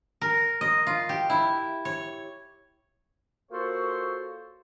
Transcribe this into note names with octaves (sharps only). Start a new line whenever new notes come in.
A#4
D#5
F4
G4
E4
C#5
A#3 F4 F#4 A4 C5 C#5